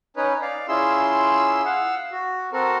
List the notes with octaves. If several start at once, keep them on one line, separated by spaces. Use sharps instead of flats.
C#4 D#4 B4 C#5
D5 F5
C#4 E4 F4 G#4 C6 E6
F5 F#5 E6
F#4
C4 F#4 A4 A#4